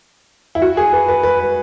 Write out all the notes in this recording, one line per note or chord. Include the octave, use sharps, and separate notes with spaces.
E4
F#4
G#4
B4
B4
B4
B4